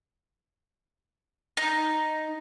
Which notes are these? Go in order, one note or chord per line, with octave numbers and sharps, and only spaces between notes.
D#4